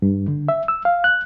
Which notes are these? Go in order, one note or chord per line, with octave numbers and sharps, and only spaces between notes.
G2
D3
E5
E6
F5
F#6